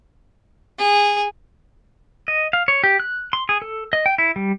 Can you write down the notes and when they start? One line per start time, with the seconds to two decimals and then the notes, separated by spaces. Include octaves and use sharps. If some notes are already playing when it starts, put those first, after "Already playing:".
0.79 G#4
2.28 D#5
2.53 F5
2.68 C#5
2.84 G4
3.00 F#6
3.33 C6
3.49 G#4
3.62 A4
3.93 D#5
4.06 G5
4.18 E4
4.36 G3